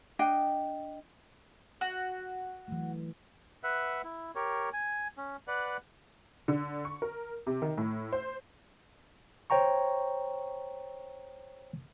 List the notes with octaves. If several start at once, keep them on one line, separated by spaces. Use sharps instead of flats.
D4 D#5 G5
F#4
E3 F#3 A3
B4 E5 F#5
E4
G4 A#4 C#5
G#5
C#4
B4 D5 F#5
D3
C#6
A#4
C3
D#3
A2
C5
C5 C#5 G5 A#5 C#6